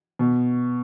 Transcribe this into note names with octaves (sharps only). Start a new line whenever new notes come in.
B2